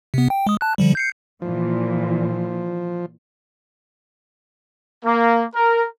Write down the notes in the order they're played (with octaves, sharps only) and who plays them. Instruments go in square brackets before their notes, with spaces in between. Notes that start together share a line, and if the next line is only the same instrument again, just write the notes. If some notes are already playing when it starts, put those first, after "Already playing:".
[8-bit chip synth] C3 B3
G5
G#3 D#6
A5 F#6
D3 F3 G3
G6 C7 C#7
[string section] A#2 E3 [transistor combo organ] F3
[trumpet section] A#3
A#4